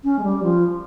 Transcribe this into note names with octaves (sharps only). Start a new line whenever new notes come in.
C#4
G#3
G3
F3